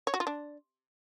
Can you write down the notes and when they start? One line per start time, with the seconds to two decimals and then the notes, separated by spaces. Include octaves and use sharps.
0.07 C#5
0.14 F#4
0.20 F4
0.27 D4